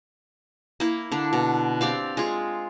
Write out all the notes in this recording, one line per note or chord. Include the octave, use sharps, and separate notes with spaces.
A#3 E4
D3 D4
B2
C4 G4 D5 F5
G#3 F4